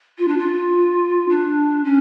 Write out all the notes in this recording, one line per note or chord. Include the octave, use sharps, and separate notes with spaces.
F4
D4
F4
D4
C#4